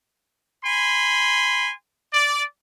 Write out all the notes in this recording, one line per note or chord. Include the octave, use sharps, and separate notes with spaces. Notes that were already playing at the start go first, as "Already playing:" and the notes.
G#5 B5 C6
D5